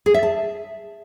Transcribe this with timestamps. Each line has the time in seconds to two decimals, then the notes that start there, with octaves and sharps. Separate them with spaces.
0.06 G#4
0.14 E5
0.23 A5